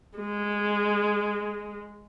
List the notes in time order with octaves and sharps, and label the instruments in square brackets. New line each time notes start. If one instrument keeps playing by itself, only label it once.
[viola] G#3